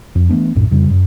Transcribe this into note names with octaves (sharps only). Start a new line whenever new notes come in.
F2
E3 A3 B3 D4
B1 F#2 A2
F2 C#3 G3
F#2